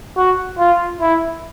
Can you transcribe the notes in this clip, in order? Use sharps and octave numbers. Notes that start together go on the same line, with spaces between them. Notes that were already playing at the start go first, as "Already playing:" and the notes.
F#4
F4
E4